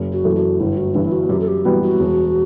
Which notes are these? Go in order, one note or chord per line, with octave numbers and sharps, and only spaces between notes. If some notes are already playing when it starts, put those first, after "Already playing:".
Already playing: F#1
F#4
F#2 E3 A3
F#4
G1 E4
F#4
G2 E3 E4
F#4
F#2 G4
A4
G4
E3 G3 B3 F#4
F#4
E1